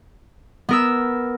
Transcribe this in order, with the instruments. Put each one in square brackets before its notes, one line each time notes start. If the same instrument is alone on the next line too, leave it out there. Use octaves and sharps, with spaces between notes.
[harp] B3 A#4 E6